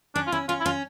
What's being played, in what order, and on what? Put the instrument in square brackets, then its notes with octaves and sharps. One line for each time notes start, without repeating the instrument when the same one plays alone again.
[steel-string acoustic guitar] C#4 [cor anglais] D4
[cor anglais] F4
[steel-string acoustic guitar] C#4 [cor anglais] E4
[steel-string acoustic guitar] C#4 [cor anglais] F4
[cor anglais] E4
[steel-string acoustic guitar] C#4 [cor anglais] F4